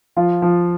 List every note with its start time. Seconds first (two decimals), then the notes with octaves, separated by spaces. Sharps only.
0.16 F3 F4
0.42 F3